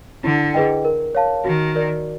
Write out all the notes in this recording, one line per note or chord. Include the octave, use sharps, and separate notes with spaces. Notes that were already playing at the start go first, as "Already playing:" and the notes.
D3 E4
G#4 B4 D#5 G5
A#4
C#5 F5 A5
D#3 F#4
A#4 D5